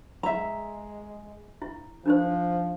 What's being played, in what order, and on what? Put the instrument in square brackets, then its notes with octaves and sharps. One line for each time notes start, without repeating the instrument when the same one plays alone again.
[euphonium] G#3 [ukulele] E5 A#5
[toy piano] E4
[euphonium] F3 [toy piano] D4 D#4 C5